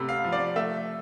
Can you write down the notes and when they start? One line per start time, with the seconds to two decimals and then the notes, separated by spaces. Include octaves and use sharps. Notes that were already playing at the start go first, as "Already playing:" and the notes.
Already playing: C3 A3 B5
0.09 F5
0.24 F3
0.32 D5
0.56 A3 E5